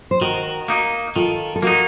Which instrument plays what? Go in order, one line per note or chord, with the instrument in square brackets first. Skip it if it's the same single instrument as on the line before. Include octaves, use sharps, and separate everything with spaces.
[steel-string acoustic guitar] C5
[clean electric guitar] D#3 [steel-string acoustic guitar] F#4 A#4
[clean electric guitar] A#3 D#4
[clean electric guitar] D#3 [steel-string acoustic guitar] F4 A4
[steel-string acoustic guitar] A4
[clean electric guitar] A#3 D#4 [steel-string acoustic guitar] F#4 A#4